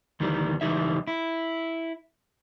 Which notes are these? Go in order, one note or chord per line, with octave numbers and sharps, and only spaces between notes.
D2 D#3 E3 G3
C#2 E3 G3 D#4 E5
E4